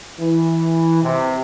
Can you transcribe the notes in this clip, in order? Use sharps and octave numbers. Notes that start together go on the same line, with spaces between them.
E3
C3